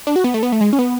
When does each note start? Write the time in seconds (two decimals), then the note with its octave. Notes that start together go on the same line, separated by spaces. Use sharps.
0.07 D4
0.16 F#4
0.24 B3
0.34 A3
0.43 B3
0.52 A3
0.61 G#3
0.73 C#4
0.79 B3